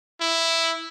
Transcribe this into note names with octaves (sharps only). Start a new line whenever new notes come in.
E4